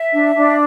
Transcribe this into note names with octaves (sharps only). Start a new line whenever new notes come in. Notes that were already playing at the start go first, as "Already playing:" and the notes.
Already playing: E5
D4
D4